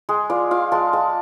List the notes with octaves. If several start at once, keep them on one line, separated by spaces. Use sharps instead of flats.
G#3 G#4
F4 D5
F4 F5
G#3 A5
G#3 A5